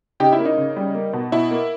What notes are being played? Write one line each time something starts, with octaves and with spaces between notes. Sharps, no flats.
C#3 D#4 G4
E4
A#3
D#4
C#3
G3
A#3
B2
B2 E4
A#3